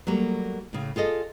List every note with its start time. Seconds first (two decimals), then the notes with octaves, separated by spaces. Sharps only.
0.07 F#3 G3 A3 A#3
0.73 A2 C#3
0.96 F4 G#4 A4 D#5